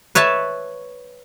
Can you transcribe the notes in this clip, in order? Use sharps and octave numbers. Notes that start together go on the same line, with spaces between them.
B4 C#5 E5 A5